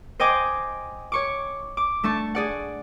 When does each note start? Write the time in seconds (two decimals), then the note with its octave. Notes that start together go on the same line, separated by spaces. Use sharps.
0.20 C5 D#5 G5 G#5 D6
1.12 C#5 C#6 D6
1.77 D6
2.04 A3 D4 A5 C#6
2.35 G#4 D5 F#5